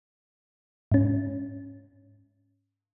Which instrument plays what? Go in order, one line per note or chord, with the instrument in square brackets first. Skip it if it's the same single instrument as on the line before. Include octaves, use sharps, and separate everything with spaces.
[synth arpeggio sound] G#2 C#4